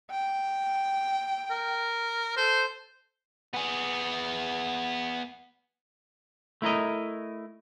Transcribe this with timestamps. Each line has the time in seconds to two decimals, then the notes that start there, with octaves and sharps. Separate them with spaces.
0.11 G5
1.50 A#4
2.37 A4 C5
3.54 B3 G#4
6.62 A3 E4 A#4 D#5